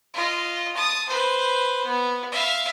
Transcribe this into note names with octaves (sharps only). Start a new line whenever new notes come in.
F4 D#5
A5 D#6
B4 C5
B3
E5 F5